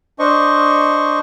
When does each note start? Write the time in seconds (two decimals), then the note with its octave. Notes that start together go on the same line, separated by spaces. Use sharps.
0.19 D4 C5 D#5 C#6